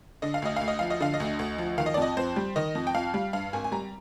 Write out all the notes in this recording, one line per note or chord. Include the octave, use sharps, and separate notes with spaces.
D3 D#5
F5
D2 D#5
D2 F5
D#5
F3 F5
D#5
D3 F5
D#5
D2
D2
F3
D#3 F5
D#5
D5
F2 D#5
F2 C5
G3
D#3 D#5
F2
G5
F2 F5
G3
G2 F5
G#1 G#5
G#5
G3 A#5